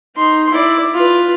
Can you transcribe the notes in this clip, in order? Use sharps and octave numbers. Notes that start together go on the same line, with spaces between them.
D#4 C6
E4 D5
F4 B4